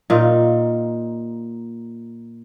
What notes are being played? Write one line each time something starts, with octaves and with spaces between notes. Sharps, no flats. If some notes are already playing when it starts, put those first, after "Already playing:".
A#2 D#4 F4